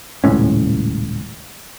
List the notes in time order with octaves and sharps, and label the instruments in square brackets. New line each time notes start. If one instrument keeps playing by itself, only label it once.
[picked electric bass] D#1 C#2 A2 C#4